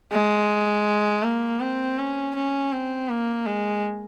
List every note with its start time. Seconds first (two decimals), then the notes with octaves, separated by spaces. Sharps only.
0.12 G#3
1.24 A#3
1.60 C4
1.98 C#4
2.36 C#4
2.73 C4
3.09 A#3
3.46 G#3